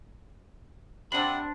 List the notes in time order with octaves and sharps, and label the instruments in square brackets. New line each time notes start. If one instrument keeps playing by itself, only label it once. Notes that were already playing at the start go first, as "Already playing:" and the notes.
[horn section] C3 [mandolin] C4 D4 [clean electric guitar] D5 F#5 B5